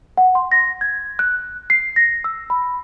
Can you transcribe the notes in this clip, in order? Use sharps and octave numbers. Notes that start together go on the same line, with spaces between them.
F#5
C6
A#6
G#6
F#6
C7
A#6
E6
B5